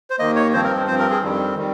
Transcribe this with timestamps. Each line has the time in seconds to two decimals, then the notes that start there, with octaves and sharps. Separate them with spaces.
0.10 C5
0.19 D#2 D#3 A#3 D#5
0.36 C#5
0.53 G2 F3 C4 C5
0.64 A#4
0.87 G2 F3 C4 C5
0.99 A#4
1.11 G#4
1.22 F2 D#3 G3 C4
1.57 D#3 G3